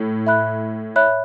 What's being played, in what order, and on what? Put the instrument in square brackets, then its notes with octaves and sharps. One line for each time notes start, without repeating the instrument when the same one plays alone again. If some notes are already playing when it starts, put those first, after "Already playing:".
Already playing: [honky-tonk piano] A2
[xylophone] E5 B5 F#6
C#5 E5 B5 F#6